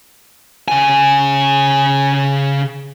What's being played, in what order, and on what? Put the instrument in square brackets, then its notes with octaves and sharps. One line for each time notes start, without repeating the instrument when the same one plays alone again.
[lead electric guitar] C#3 G#5